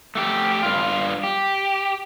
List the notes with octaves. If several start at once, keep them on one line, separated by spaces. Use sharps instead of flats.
A3 F#4 G4
G2 F4
G4